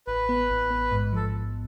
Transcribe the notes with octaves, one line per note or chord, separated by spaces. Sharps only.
A1 B4
B3
A1
B3
G#2
F3 A4